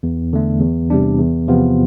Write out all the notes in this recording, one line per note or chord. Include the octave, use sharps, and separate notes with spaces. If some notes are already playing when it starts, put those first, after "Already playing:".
E2
D3 A3
E2
C3 G3 D4
E2
C3 F3 B3 F4